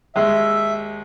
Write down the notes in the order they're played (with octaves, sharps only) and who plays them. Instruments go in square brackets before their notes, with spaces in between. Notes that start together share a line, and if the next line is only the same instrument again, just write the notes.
[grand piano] D#2 G#3 [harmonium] E5